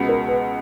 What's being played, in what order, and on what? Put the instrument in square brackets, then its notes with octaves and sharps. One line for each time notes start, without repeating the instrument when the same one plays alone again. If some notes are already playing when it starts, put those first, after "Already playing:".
Already playing: [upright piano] C#2 B2 G#3 B3 F#4
[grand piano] A#4
B4